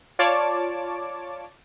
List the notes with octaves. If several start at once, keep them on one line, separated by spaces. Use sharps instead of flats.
F4 C#5 D5 A5 D6